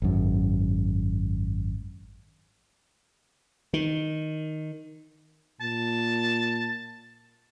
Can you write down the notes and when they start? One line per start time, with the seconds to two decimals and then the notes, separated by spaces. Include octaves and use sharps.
0.02 G#1 F#2
3.74 D#3
5.61 A#2 A5